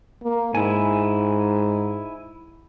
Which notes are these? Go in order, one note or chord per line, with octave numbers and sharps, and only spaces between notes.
A#3
G#2 E4 G#5